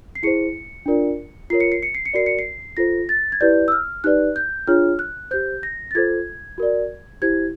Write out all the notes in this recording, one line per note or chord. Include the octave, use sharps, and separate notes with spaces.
C7
E4 G#4 C5 C#7
D4 F4 A#4 D5
F4 A#4 C#5 C7
C#7
C7
C#7
C7
C#7
F#4 A#4 D5 C7
C#7
C7
F4 A4 C5 A#6
A6
G#6
E4 G4 B4 D5 G6
E6
F6
D#4 G4 B4 D5 F#6
G6
D4 F4 G#4 C#5 F6
F#6
G4 C5 G6
A#6
A6
F4 A4 C5 G#6
F#4 A#4 D5
E4 G4 C5 G#6